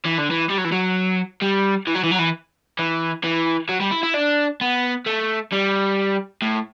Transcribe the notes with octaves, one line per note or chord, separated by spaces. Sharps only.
E3
D3
E3
G3
F#3
E3
F#3
G3
E3
F#3
E3
F#3
E3
E3
E3
F#3
G3
E4
E4
D4
B3
A3
G3
A2